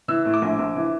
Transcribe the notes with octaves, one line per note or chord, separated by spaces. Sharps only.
E3 E6
A2
D6
A#1
A#1
E3